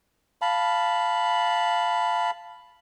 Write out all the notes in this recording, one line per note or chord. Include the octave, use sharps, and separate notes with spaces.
F5 A5 B5